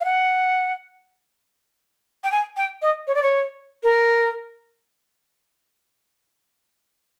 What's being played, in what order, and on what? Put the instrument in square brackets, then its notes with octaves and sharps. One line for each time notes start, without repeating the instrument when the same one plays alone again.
[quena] F5
F#5
G5
G#5
G5
D#5
C#5
D5
C#5
A#4